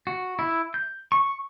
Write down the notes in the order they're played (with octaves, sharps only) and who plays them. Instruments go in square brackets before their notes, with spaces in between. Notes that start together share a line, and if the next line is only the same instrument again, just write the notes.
[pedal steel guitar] F#4
E4
G6
C#6